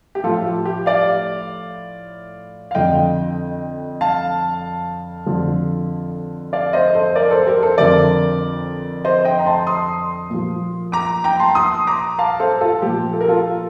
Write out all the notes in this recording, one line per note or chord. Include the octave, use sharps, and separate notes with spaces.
G4
A2 F3 F4 A4
G4
G4
D5 F5
F5
F2 D3 F3 D#5 G5
F5 A5
F2 D3 F3
D5 F5
C5 D#5
A4 C5
A#4 D5
A4 C5
G4 A#4
A4 C5
F2 D3 F3 A#4 D5
C5 D#5
D#5 G5
A#5
A5 C6
C6 D#6
A#2 F3
A#5 D6
G5 A#5
A5 C6
C6 D#6
A#5 D6
F5 A5
A4 C5
F4 A4
A#2 F3 G4
A4
A#4
F4 A4